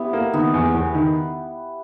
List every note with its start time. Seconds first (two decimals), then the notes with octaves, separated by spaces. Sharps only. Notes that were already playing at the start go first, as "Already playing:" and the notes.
Already playing: B3 E4 G4
0.13 A#3
0.33 D#3 B3
0.54 E2
0.74 E2
0.94 D#3